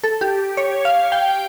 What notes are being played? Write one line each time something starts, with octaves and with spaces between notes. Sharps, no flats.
A4
G4
C#5
F5
G5